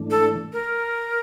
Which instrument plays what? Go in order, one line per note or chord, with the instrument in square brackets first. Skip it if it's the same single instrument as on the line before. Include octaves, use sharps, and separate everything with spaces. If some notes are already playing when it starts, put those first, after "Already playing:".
Already playing: [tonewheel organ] G#2 E3 A3 D4
[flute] A4
A#4